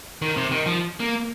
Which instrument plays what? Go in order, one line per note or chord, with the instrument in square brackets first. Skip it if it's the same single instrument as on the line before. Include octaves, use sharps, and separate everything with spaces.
[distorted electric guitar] D#3
C3
D#3
F3
A#3